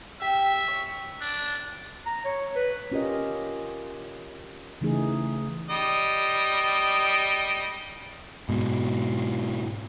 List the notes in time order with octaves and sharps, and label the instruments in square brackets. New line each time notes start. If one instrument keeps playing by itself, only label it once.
[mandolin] G4 [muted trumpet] E5
[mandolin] C#5
[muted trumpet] D4
[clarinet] A#5
C#5
B4
[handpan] C#4 F4 G4 A#4 D#5
C#3 E3 A3 D#4 G#4
[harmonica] G3 D#5
[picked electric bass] G#2 B2